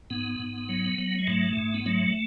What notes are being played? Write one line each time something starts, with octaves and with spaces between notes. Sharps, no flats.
G#2 B3
G#2
F#3
F#3
G#3
G#2 A3
G#2
B3
F#3 A3